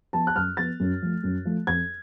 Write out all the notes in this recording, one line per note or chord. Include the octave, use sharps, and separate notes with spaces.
F3 B3 A5
F#6
F#2 F6
F3 B3 A6
F#2
F3 A3
F#2
F3 A3
F2 G#6